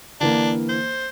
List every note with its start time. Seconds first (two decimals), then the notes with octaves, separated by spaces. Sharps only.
0.21 D3 E3 A#3 D4
0.69 C5